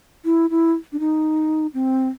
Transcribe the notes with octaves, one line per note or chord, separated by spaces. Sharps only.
E4
E4
D4
D#4
C4